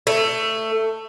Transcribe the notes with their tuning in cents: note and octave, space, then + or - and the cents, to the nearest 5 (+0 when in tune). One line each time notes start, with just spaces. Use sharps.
A3 +15